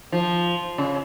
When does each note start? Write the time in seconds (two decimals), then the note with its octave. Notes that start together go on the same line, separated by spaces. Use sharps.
0.12 F3
0.78 C#3